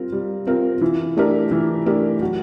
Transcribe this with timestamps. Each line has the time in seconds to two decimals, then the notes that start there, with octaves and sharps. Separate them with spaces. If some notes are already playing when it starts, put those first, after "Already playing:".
Already playing: G3 C4 F4 A#4
0.12 G3
0.47 C4 F4 A#4
0.81 E3
1.17 A3 D4 G4 A#4
1.51 E3
1.86 A3 D4 G4 A#4
2.21 F#3